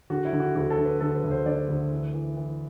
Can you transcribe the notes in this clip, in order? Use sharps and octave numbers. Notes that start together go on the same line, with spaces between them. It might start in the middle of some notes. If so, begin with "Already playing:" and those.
D3 F#4
E4
D3
F#4
D2 F#4
A4
D3
B4
D3 A4
B4
D2
C5
D3 D5
D2
E3
E3
E3